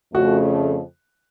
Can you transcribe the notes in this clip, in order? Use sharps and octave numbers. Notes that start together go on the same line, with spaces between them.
F2 C#3 A3 F#4